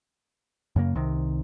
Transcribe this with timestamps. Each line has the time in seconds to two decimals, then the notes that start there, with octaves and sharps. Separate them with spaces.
0.76 F#2 C#3 A#3
0.95 C2 C3 D#3